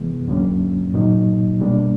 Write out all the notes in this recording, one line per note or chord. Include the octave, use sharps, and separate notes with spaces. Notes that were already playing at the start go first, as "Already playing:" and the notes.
Already playing: C3 E3 G#3 B3
D2 D3 F#3 A#3 C#4
A#2 F#3 A#3 D#4
B2 G3 A#3 D4